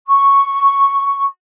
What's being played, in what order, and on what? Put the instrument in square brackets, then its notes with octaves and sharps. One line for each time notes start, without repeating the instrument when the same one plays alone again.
[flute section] C#6